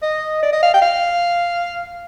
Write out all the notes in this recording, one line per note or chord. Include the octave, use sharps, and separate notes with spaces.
D#5
D5
D#5
F5
G5
F5